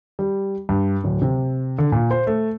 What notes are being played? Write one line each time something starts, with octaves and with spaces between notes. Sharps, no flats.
G3
G2
D1
C3
D3
A#2
C5
A3